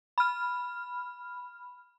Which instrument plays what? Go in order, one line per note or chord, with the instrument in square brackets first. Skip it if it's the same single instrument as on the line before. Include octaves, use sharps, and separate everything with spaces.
[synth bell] B5 F6